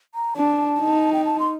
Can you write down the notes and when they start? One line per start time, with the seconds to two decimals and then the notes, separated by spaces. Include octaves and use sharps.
0.15 A#5
0.36 D4 A5
0.80 D#4
1.13 G5
1.25 A5
1.39 C6